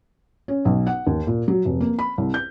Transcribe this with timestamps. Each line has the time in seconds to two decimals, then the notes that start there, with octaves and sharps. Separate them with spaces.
0.48 C#4
0.65 B1
0.87 F#5
1.07 D#2
1.27 A#2
1.48 F#3
1.65 F1
1.80 A#3
1.99 B5
2.18 C2
2.34 G6